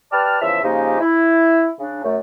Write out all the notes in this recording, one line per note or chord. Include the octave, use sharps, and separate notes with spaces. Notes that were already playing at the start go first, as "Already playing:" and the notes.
G4 B4 D5 A5 F6
E2 C#3 F3 E5
C#3 F3 G#3 A#3 D#4 G4
E4
C#3 D4
F#2 A3